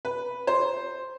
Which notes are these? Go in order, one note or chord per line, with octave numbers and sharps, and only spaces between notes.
B4
C5